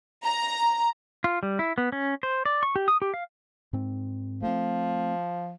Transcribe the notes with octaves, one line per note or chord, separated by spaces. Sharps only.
A#5
F4
G3
E4
B3
C#4
C5
D5
C#6
G4
D#6
G4
F5
G#2 C4
F3 A3 A#3 C4